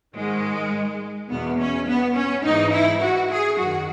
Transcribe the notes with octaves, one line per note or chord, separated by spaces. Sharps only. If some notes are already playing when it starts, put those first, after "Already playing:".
G#2 D#3 G#3
E2 B2 B3
C#4
B3
C#4
G#2 E3 D#4
E4
F#4
G#4
F#2 D#3 F#4